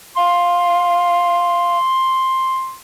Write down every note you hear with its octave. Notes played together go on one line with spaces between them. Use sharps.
F5 C6